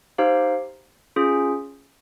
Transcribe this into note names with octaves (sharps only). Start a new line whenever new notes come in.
D#4 G4 C5 F5
C#4 F4 G#4